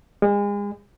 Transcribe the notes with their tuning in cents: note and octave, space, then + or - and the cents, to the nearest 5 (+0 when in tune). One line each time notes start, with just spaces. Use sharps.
G#3 -35